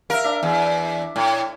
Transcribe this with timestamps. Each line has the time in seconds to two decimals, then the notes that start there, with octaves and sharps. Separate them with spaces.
0.10 A#4 E5 F5
0.24 D4 E5
0.43 E2
1.16 A2